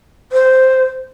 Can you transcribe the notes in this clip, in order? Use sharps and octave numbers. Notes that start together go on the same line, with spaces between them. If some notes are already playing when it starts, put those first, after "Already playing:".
C5